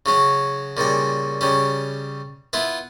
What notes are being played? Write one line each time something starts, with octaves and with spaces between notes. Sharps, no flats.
C#3 F#3 C#4
A#2 C#3 G3 G#5
C#3 G3 C#4
B3 E4 F4